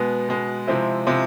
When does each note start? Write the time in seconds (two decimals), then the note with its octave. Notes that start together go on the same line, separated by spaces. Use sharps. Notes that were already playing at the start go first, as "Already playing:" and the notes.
Already playing: B2 G#3 B3
0.28 B2 G#3 B3
0.67 C3 F3 G#3 C4 E4
1.06 C3 F3 G#3 C4 E4